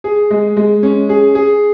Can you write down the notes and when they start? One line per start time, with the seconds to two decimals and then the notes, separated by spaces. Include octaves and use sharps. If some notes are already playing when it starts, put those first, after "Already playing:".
0.04 G#4
0.31 G#3
0.57 G#3
0.83 C#4
1.09 G#4
1.35 G#4